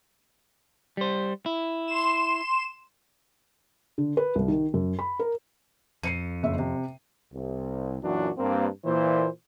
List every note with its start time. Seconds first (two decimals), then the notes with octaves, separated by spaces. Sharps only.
0.97 G3 C5
1.46 E4
1.88 C6 E7
3.98 D3
4.17 B4
4.35 C2
4.48 D#3
4.74 F#2
4.99 B5
5.19 A#4
6.03 F2 C7 C#7 D#7
6.43 F#1 E5
6.59 C3
7.34 C2
8.03 F#2 A#2 E3 F#3 D4 F#4
8.38 G2 A#3 C4
8.85 A#2 E3 C5